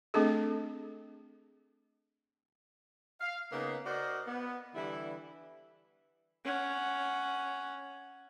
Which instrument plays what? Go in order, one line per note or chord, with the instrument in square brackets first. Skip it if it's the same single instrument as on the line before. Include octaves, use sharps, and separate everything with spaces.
[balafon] A3 C4 D4 G#4 A4
[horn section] F5
C#3 A#3 B3 D#4
F#4 A#4 C5 D5 D#5
B3
D3 E3 G3 E4
[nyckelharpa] C#4 F#5